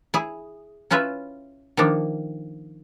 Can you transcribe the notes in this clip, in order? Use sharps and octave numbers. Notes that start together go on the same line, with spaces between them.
E4 G#4
C#4 E4 F4 B4 E5
D#3 F3 A#3 D4